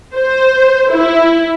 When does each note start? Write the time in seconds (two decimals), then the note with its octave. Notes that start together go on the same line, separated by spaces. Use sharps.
0.14 C5
0.91 E4